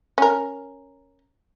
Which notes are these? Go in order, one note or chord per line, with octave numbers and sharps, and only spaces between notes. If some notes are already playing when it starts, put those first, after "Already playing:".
C#4 A#4